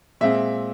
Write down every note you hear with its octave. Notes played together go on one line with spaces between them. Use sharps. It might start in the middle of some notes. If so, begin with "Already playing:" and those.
A#2 G#3 C4 E5